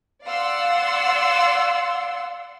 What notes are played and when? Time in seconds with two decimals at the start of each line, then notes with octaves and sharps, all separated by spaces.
0.24 D5 F5 F#5 C6 E6